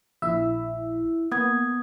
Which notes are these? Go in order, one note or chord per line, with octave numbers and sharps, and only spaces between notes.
A#1 E4 E5
A#3 B3 D#6 G#6